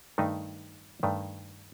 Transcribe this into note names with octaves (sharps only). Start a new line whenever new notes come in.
G2 D#3 A3 D#4
G2 D#3 A3